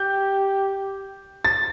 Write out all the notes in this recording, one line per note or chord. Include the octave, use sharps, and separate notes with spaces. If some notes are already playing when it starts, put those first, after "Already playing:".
Already playing: G4 G6
A6